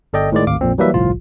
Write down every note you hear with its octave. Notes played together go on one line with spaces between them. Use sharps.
G1 A4 D5 D#5 G5
A2 D#3 G#3 D5
G#1 D2 F5 D6
A#1 F2 A#2 C4
E3 F#3 G3 A#3 B4 E5
G1 C2 A2 F3 F4